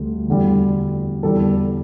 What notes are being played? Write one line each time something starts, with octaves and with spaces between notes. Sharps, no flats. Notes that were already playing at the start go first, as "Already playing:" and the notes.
Already playing: D2 D3 G3
E2 D3 G3
E2 D3 G3 A4